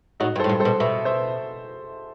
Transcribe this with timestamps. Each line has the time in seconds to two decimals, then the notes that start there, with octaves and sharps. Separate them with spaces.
0.20 A2 D#4 F#4
0.36 G2
0.40 A4 C5
0.44 A2
0.49 G2
0.60 A4 C5
0.65 B2
0.80 B2 E5
1.05 C5 E5